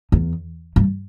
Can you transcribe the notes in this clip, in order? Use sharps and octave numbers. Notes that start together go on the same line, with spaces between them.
E2
G2